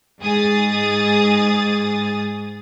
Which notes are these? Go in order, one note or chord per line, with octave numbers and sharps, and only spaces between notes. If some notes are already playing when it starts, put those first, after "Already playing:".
G#2 G#4 D#6 A6